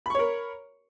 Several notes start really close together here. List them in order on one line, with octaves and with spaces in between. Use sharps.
B5 C#6 C#5 A#4